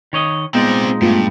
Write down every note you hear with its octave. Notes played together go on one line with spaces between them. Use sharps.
D#3 C#5 D#5
A#2 G#3 B3 C4 D#4 D5
G2 A3 B3 F4